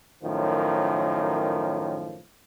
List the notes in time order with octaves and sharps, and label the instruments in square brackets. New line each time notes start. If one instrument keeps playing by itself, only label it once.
[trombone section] F#2 A2 D#3 F3